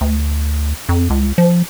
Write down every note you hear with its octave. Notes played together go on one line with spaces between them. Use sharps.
D2
F2
C#2
F3